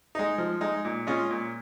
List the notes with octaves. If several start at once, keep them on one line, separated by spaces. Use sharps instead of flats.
G#3 D#4
F3
G#3 D#4
A#2
G#3 C#4 F4
A#2